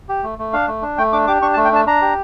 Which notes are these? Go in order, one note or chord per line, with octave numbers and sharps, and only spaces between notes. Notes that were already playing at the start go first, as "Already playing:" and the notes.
G4
A3
A3
D4 F5
A3
D4
A3 G5
D4 D6
G4 D6
D4 C#6
A5
A3
G5
D4 A5
D4 A#5
G4